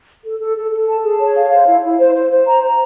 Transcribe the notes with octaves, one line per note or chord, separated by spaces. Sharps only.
A4
A4
A4
A4
A5
G#4
C#5
F5
C5
E4
E4
C5
C5
C5
A#5
A#5